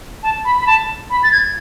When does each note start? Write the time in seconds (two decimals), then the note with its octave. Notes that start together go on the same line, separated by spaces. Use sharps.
0.23 A5
0.45 B5
0.60 B5
0.67 A5
1.10 B5
1.23 A6
1.32 G#6